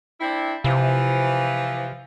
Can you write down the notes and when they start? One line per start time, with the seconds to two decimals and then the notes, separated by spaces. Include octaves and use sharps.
0.20 C4 D4 E4
0.64 C3 E3 F3